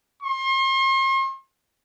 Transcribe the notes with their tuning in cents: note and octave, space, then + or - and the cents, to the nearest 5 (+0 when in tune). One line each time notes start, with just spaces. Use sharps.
C6 +40